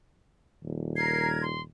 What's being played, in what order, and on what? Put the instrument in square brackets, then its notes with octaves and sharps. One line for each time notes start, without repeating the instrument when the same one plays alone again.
[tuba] D#1
[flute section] A#4 G#6 [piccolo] C7
[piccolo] C6